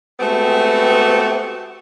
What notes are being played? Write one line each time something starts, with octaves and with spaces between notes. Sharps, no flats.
G#3 A3 B3 C4 F#4 G4